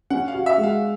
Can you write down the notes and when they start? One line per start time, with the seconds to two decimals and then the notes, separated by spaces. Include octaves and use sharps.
0.10 C#4 F#5
0.28 F5
0.34 F#4
0.46 E5
0.58 G#3
0.63 F5